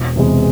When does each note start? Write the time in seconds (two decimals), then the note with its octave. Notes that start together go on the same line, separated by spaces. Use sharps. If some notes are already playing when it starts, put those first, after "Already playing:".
Already playing: E1
0.16 E2 C3 E3 G#3